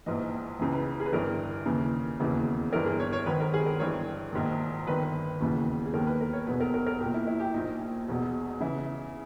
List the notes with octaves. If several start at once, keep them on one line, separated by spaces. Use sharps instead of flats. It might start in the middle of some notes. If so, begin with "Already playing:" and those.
A#1 G#2 E3 D#5
C#2 C#3 E3
B4
G#4
B4
G1 G2 E3 A#4
D#2 C#3 E3
E1 D#2 C#3 E3
G1 G2 E3 A#4
G#4
C#5
C#5
G#1 G#2 D#3 B4
A#4
G#4
A#4
G1 G2 E3 C#5
A#1 G#2 D#3
G1 G2 D#3 B4
E1 D#2 C#3 E3
G#4
D#2 D#3 A#4
B4
A#4
C#5
E1 E2 B2 B4
A#4
A#4
A#4
B1 A#2 G4
E4
E4
G4
A#1 A#2 D#4
E1 E2 B2
C#3 E3 E4